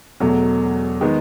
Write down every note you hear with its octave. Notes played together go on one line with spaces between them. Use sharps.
E1 E2 B2 F#3 A3
D#3 G#3 B3